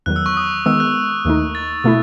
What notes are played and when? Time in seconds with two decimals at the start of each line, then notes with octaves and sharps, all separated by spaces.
0.06 E2 D#3 F#3 F#6
0.16 E6
0.26 C#6
0.37 D#6
0.66 D#3 G#3 B3 E6
0.80 F#6
1.25 D#2 D#3 A3 D#4
1.55 A6
1.84 B2 A3 E4